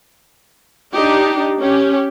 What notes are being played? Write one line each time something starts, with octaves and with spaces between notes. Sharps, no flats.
D4 D#4 G4
C#4 G4